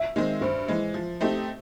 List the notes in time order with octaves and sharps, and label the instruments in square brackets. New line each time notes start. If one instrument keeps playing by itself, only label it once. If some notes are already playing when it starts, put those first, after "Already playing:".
Already playing: [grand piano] E5
[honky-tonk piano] D#3 G#3 C4
[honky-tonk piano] G2 [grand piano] C5
[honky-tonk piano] E3 G#3
F3
A3 C4 D#4 G4